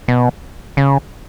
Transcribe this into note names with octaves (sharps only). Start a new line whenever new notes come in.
B2
C#3